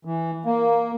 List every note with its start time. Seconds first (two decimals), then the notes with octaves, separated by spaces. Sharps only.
0.05 E3
0.45 A#3